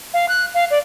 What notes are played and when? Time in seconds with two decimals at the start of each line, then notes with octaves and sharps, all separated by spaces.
0.14 F5
0.29 F#6
0.54 F5
0.71 D5